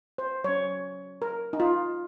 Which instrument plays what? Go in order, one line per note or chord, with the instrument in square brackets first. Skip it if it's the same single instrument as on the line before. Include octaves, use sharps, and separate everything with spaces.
[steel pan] C5
F#3 C#4 C#5
A#4
D#4
F4